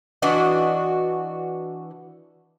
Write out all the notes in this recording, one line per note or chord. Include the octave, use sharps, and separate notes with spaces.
E3 D4 F#4 D#5